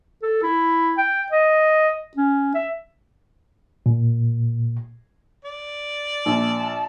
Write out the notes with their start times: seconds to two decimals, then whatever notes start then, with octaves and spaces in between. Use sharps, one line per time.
0.22 A4
0.43 E4
0.98 G5
1.32 D#5
2.17 C#4
2.55 E5
3.86 A#2
5.45 D5
6.26 A#1 A5